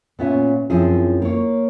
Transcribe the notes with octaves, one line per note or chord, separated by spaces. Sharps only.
A#2 B3 C#4 E5
F#2 F3 C4 E4 G#4
A#3 C#5